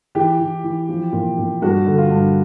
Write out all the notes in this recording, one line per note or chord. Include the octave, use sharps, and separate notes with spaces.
E3 G4
E3
E3
F3
A#2
A#2
G2 F#4
D3
F4
G2